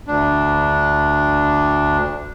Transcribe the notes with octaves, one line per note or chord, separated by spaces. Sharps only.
D2 D4